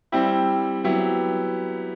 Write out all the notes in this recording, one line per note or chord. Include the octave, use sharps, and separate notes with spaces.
G3 C4 E4 G4
F#3 B3 E4 G4